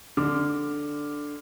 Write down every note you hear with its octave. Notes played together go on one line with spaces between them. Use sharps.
D3 D6 F6